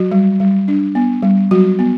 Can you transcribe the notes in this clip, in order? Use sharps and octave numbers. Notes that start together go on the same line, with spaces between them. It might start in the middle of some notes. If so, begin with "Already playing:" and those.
Already playing: F#3 F#4
G3
G3
D4
B3
G3
F#3 G3 F#4
B3